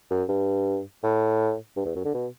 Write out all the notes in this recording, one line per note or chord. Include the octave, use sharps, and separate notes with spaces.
F#2
G2
A2
G2
E2
F#2
D3
B2